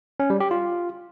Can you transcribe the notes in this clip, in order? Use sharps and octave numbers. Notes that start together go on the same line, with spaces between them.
C#4
G3
G4
F4